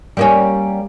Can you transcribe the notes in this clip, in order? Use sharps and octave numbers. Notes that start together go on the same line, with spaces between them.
G3 A#3 C#4